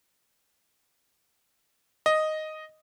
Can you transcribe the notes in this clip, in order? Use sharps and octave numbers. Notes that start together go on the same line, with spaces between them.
D#5